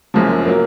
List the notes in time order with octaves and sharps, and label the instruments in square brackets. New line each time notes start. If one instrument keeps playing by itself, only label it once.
[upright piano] F#1 F#2 F3 G#4
F#3 A#3 A#4